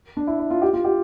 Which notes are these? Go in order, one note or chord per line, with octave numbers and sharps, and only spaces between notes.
D4
E4
E4
F4
G4
F4
G4